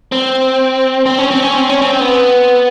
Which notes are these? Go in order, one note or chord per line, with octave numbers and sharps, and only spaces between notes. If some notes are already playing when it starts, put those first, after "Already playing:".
C4
C4
C#4
C4
C#4
C4
C#4
C4
B3